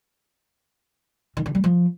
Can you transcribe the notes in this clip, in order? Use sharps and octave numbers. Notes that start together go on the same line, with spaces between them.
D#3
D3
G3
F3